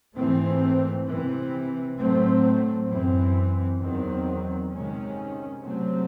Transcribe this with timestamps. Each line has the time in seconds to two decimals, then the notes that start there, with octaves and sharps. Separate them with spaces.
0.15 G#2 E3 A3 C4
1.06 C3 E3 C4
1.98 A2 F#3 A3 C4
2.89 F#2 E3 C4
3.80 E2 D#3 F#3 C4
4.71 C3 D#3 G#3 C#4
5.63 C3 F#3 A3 C4